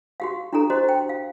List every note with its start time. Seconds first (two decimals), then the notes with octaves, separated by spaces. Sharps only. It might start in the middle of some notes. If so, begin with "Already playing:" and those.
0.20 F#4 G4 F5
0.53 D4 E4 G4 A4 A#5
0.70 F#4 G4 C5 D#5
0.89 G5
1.09 F5